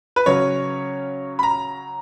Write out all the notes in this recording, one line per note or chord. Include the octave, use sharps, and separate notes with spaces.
B4
C#3 F#3 C#4 C#5
B5
A#5